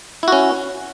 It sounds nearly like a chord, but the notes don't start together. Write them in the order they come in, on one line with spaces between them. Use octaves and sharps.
E4 F#4 C#4